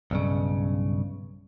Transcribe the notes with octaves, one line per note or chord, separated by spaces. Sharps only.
B1 G2 C#3